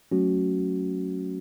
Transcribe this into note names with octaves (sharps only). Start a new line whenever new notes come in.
F#3 A3 C#4 F#4